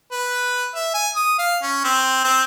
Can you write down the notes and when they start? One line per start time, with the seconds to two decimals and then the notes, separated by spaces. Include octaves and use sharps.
0.12 B4
0.75 E5
0.94 G#5
1.16 D#6
1.39 F5
1.62 C#4
1.84 C4
2.24 C4